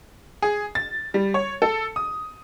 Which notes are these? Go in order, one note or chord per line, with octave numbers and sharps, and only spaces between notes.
G#4
A6
G3
C#5
A4
D#6